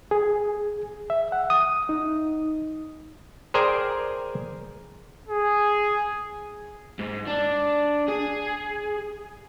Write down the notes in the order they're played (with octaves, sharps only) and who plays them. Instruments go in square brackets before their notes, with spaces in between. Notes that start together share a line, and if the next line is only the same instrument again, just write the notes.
[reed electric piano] G#4
E5
F#5
D#6
D#4
[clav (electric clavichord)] G#4 A#4 C5 D5 G5 G#5
[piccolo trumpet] G#4
[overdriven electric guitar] G#2
D4
G#4